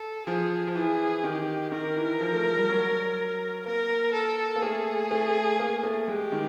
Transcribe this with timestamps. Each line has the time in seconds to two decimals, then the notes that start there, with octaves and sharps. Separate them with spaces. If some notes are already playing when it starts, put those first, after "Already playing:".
Already playing: A4
0.26 F3 G#4
0.67 F3
0.75 E3 G#4
1.24 D#3 G4
1.72 D#3 A#4
1.96 E3
2.21 F3
2.33 A3
2.45 G#3
2.57 G3
2.69 F#3
3.66 A#3 A#4
4.13 A4
4.56 A#3
4.62 A3 G#4
5.11 A3
5.59 A#3
5.83 A3
6.08 G#3 G4
6.32 D#3